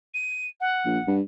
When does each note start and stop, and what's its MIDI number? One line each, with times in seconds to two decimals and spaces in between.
0.14 0.47 99
0.60 1.14 78
0.86 0.99 34
1.07 1.21 43